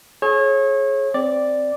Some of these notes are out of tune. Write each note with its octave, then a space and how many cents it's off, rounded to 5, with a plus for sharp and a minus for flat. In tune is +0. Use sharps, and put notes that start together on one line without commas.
G#4 +35 C#5 -30
C4 +0 D5 +0 D6 +0